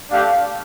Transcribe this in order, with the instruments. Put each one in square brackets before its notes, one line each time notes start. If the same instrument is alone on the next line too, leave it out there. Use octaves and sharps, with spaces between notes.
[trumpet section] A3 D4 G4 F5